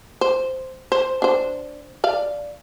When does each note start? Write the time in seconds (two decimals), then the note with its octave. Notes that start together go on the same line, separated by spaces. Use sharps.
0.21 C5
0.92 C5
1.22 D4 C5
2.04 D5 F5